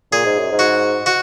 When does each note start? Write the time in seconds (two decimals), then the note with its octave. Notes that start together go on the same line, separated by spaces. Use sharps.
0.12 A#2 G#4
0.25 G#2
0.38 F#2
0.52 G#2
0.59 F#4
1.06 F#4